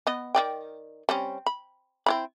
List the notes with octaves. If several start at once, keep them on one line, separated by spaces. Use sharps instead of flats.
B3 D#5
D#3 D5 G5
G3 C4 C#4
B5
C4 E4 B5